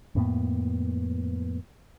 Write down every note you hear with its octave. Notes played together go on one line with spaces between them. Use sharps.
F2 A2 A#3 B3